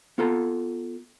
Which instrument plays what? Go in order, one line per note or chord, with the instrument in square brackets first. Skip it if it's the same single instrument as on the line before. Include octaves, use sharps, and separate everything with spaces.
[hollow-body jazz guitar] B3 F4 A4 A#5